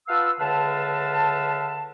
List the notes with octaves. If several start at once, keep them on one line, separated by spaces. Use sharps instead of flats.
F4 B4 F5 F#5 A5 E6
C#2 D3 B4 E5 F5 A5